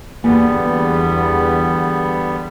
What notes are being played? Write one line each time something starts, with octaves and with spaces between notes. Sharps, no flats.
E2 D3 G3 A#3 B3